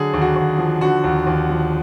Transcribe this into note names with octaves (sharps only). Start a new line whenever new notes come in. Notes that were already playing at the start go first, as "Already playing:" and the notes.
Already playing: D3 F#3 G#4
D#2
F#4
D#2
F3
D3 F#4
D#2
D#2
F3